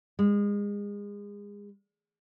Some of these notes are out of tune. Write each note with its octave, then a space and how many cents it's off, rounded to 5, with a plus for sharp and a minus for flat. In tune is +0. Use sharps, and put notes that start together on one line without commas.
G#3 -30